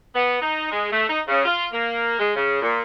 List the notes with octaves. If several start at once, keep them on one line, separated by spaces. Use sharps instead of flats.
B3
D#4
G#3
A3
D#4
C#3
F4
A#3
G#3
C#3
A#2